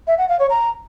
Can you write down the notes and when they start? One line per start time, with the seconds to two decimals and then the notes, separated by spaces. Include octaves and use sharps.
0.07 E5
0.18 F#5
0.29 F5
0.39 C#5
0.50 A#5